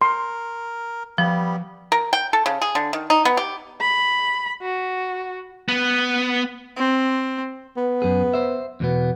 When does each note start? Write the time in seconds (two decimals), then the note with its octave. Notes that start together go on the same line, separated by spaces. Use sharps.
0.02 A#4 C6
1.18 F3 G3 B3 G4
1.92 A#4
2.13 G5
2.33 A4
2.46 C#3
2.62 G#4
2.75 D3
2.93 D#3
3.10 D#4
3.25 B3
3.37 G4
3.81 B5
4.61 F#4
5.68 B3
6.77 C4
7.77 B3
8.02 F#2 G#4
8.34 C5 E5
8.80 E2 B2 B3